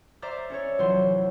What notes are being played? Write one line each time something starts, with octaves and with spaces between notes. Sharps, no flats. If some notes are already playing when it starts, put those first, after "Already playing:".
C5 D5 E5 A#5 D6 F6
C#4 A4 C#5
F1 E3 F#3 C5 C6